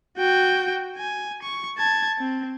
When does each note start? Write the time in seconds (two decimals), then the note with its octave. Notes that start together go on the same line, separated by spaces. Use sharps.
0.17 F#4 G5
0.97 G#5
1.43 C#6
1.78 A5 G#6
2.19 C4